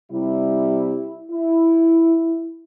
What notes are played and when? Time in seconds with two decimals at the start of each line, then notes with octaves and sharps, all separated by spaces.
0.10 C3 G3 E4
1.31 E4